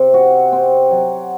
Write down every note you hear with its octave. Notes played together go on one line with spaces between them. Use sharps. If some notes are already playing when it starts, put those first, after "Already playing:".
Already playing: C3
F#4
C4
F#3